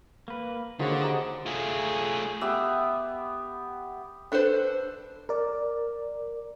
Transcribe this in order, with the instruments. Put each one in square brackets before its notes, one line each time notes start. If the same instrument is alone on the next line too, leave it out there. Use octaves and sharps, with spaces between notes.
[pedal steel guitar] A#3 B4
[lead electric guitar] D3 [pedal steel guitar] D#3 A#3 C#5 [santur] F#4 G#4 C5
[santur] D#4 G4 [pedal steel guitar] F#5 D#6
[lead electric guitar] A3 F4 [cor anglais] G#4
[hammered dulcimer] B3 G4 E5
[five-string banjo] D4 A4 B4 C5
[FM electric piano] A#4 D5